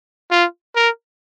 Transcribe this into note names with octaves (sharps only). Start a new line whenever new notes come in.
F4
A#4